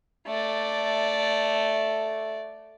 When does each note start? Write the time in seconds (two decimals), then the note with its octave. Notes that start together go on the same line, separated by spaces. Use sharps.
0.26 A3 D5